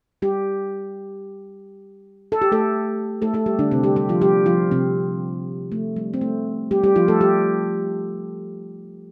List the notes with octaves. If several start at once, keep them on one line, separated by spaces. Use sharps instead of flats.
G3 G4
A4
G4
A3 A4
A3 A4
A3 A4
G3 G4
D3 D4
C3 C4
G3 G4
G3 G4
F3 F4
G3 G4
F3 F4
C3 C4
A3
G3
C4
A3
G3 G4
G3 G4
F3 F4
A3 A4
G3 G4